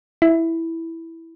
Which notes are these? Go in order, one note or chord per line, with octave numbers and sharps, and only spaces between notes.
E4